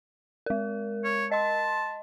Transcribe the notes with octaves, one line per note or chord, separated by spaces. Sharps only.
G#3 A#4
C#5
D#5 A5 C6